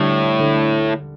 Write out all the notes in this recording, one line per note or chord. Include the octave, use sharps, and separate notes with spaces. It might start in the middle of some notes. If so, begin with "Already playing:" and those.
Already playing: A2 D3 G3
D3